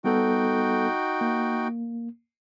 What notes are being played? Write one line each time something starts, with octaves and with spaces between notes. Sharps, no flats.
G3 B3 D#4 F#4 A4 G5
A#3